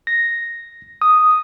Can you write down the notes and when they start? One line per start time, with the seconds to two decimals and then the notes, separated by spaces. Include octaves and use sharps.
0.07 A#6
1.02 D#6